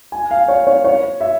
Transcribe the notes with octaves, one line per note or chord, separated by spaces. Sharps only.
G#5
F5
C#5
C#5
C#5
E5